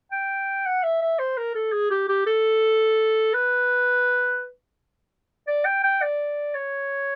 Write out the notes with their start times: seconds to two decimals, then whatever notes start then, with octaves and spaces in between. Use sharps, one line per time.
0.12 G5
0.66 F#5
0.83 E5
1.01 E5
1.19 C5
1.37 A#4
1.55 A4
1.72 G#4
1.91 G4
2.09 G4
2.26 A4
3.34 B4
5.48 D5
5.65 G5
5.84 G5
6.02 D5
6.55 C#5